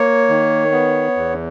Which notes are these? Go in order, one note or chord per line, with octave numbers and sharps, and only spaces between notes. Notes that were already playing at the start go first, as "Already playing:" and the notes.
Already playing: A#3 C#5
D#3
B3
E2